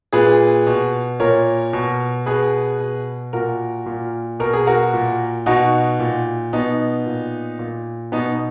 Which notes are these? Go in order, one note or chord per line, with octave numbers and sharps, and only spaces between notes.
A#2 G#4 B4
B2
A#2 A#4 C#5
B2
B2 G#4 B4
B2
A#2 F#4 A#4
A#2
B2 A#4
G#4
F#4 A#4
A#2
B2 D#4 F#4
A#2
B2 B3 D#4
A#2
A#2
B2 B3 D#4